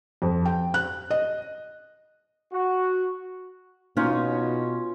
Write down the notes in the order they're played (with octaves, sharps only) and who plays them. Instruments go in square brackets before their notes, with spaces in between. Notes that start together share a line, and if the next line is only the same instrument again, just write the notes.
[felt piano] F2
G5
F#6
D#5
[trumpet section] F#4
[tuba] B2 [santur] C#4 F4 [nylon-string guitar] D#4